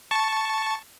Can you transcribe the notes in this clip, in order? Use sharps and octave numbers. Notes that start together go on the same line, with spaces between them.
A5 C#6